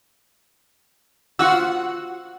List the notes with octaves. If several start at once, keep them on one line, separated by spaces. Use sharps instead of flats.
F4 F#4 F#5 E6